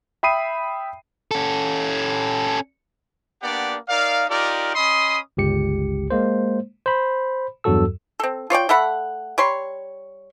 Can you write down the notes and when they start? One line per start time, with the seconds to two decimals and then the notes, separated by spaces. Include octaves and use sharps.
0.23 E5 G5 B5 D#6 C7 D#7
1.31 C#4 A4
3.42 A#3 B3 D4 G4 D5 F#5
3.89 D#4 A#4 D5 F5
4.30 D#4 F4 G4 A#4 D5
4.75 C#4 D#5 B5 C6 D#6
5.37 G1 C#2 G4 C#7
6.10 G#3 A#3 C5
6.86 C5 B5
7.64 E2 G2 F#3 F#4 A4 E6
8.20 C4 A4
8.50 F4 C#5 D5 G5
8.69 A3 A4 F#5 B5
9.38 G3 C#5 C6